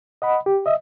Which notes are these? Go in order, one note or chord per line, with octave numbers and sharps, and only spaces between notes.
D#5 F#5 B5
G4
D#5 E5